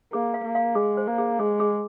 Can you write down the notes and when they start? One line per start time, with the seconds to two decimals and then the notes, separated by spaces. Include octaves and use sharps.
0.13 A#3 G#4
0.34 F5
0.45 A#3
0.55 F5
0.75 G#3 G#4
0.97 C5
1.08 A#3
1.18 G#4
1.39 G#3 G#4
1.60 G#4